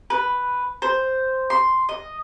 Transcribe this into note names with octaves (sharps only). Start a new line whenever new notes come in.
B4
C5
C6
D#5